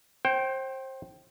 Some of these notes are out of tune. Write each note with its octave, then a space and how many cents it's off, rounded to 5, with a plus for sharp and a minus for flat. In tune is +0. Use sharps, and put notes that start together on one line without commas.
C5 +25 G5 -15